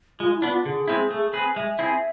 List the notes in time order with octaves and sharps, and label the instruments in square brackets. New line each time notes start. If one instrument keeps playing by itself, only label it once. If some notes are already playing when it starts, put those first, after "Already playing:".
[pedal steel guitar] G#3 [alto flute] F4
[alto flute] E4
[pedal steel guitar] B3 D4
[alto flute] F4
[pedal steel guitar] D3 [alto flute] G#4
[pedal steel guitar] G#3 C4 E4
A3
C4 G#4 B4
[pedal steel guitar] G#3 [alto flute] E5
[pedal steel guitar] C4 E4 G#4